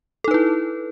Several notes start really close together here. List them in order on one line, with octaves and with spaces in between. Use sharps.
A4 D#4 B4 E4